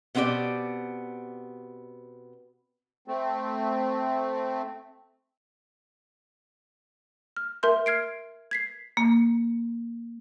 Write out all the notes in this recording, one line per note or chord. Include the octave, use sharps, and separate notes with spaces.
B2 B3 C4 D#4 G4 D5
A3 C4
F6
A#4 E5 C6 G6
F6 G#6 C7 D7
G#6 B6 C7
A#3